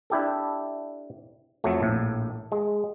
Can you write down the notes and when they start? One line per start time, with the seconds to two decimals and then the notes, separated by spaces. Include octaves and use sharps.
0.10 D4 E4 G4 A4
1.64 F2 F#3 A3
1.81 A#1 A2
2.52 G#3